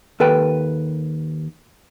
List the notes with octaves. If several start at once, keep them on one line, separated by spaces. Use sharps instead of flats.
D#2 A4 B4 G5